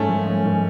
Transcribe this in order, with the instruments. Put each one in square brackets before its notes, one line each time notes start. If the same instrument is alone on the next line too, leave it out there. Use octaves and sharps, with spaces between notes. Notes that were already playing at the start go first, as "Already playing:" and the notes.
Already playing: [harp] G#2 G#3 [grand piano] A3 C#4
[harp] F3
G#3
G#2